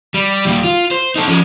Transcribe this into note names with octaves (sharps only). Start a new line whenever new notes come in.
G3
D#2 G3
F4
C5
D#4 A4
F3 C#4